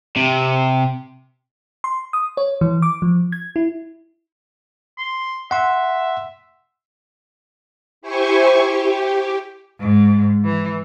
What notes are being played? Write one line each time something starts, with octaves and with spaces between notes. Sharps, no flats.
C3
C6
D#6
C#5
E3
D6
F3
G#6
E4
C6
E5 F#5 C6
E4 G4 C5 G#5 C#6
G4
G#2
E3